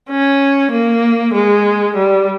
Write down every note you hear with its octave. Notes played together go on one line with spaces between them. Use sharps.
C#4
A#3
G#3
G3